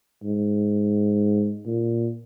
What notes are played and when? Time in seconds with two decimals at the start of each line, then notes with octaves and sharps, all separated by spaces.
0.23 G#2
1.66 A#2